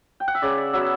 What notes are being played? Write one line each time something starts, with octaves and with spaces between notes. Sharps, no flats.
G5
F#5
E5
C#3 D5
D5
F#3 B3 E5